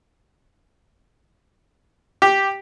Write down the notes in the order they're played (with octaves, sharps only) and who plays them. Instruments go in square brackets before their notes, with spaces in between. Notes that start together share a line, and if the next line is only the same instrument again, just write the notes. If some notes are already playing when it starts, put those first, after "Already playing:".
[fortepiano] G4